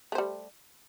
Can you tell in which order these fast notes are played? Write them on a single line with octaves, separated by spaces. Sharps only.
A3 C5 G3